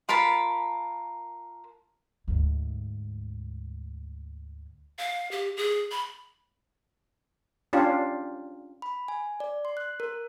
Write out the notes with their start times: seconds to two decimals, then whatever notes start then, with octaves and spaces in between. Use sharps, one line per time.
0.09 F4 A#4 A5 B5
2.28 D2 G#2
4.99 F5
5.31 G4
5.57 G#4
5.91 B5
7.73 C#4 D4 F4 G4
8.82 B5
9.08 G#5
9.40 D5
9.65 C6
9.77 F#6
10.00 A#4